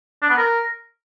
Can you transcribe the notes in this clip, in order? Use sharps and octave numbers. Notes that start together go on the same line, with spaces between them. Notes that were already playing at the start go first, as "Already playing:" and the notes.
D4
B3
A#4